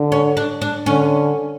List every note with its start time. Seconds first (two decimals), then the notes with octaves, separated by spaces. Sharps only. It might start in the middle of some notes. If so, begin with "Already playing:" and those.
Already playing: D3
0.12 C#4
0.37 D4
0.62 D4
0.86 D3 C#4